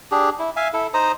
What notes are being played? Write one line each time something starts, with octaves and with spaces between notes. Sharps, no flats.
D4 G4 G#4
E4
E5 F5 G#5
E4 A4
D#4 C5 A#5 D#6